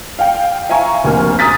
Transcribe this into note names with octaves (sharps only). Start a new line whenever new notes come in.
F5 G5
E5 F5 G#5 A#5 C#6
F1 D2 A#3 G#5 C#6 F6
A#5 D#6 A6 B6